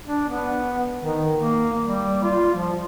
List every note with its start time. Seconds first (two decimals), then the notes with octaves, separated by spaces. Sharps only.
0.06 D4
0.28 B3
1.00 D#3
1.36 A#3
1.82 G3
2.23 F4
2.54 F3